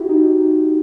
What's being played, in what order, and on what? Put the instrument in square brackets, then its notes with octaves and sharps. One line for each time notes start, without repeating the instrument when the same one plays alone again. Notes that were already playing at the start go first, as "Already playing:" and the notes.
Already playing: [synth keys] E4 F#4 G4
D#4